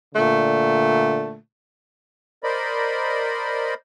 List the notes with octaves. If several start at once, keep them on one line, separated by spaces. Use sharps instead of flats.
A#2 D3 A3
A#4 C5 D5 D#5 B5